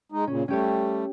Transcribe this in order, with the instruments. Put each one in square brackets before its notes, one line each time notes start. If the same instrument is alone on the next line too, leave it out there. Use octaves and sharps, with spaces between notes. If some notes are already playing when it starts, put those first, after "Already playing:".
[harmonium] G#3 D#4
[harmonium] A#2 C#3 [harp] C#4
[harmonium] G3 A3 [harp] C#4 G4 C#5